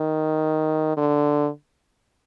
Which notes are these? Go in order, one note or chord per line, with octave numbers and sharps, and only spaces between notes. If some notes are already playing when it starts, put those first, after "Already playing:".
Already playing: D#3
D3